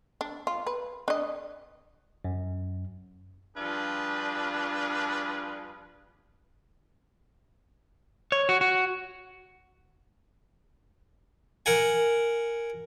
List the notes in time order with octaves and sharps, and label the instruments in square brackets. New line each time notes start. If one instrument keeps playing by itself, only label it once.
[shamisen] D4
F4
B4
D4 D#5
[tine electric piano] F#2
[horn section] F3 G3 D4 F4 G#4 B4
[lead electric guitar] C#5
F#4
F#4
[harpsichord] A#4 F#5 G#5